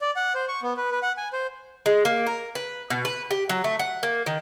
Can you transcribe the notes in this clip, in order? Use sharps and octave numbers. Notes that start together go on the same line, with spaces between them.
D5
F#5
C5
C#6
B3
B4
B4
F#5
G#5
C5
G#3
A#3
A#4
B4
B2
B4
G4
F#3
A3
F#5
A#3
D#3